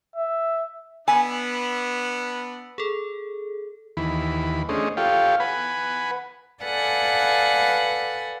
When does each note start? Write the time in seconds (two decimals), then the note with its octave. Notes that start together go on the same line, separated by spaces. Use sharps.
0.16 E5
1.08 B3 D4 G#5 E6 B6
2.78 G#4 A4
3.97 D#2 E3 B5
4.69 A3 C#4 D4 G#4 C5 D#5
4.97 F4 G4 A4 C#5 F5 G5
5.40 B4 F#5 G#5 B5
6.64 A4 B4 D5 F5 F#5 G#5